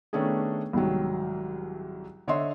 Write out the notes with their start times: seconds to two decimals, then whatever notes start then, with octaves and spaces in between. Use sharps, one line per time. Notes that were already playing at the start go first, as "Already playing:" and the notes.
0.13 D#3 A3 B3 C#4 D4 G#4
0.73 C2 G#2 D#3 F#3
2.28 D3 C#5 D#5 E5 C6